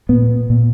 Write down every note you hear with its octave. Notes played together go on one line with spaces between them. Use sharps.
A#2 B3
A#2